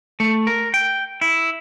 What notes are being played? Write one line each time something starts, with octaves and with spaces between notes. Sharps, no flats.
A3
A#4
G5
E4